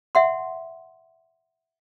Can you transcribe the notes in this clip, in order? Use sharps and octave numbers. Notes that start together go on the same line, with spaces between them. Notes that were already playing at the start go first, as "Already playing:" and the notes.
E5 F#5 C6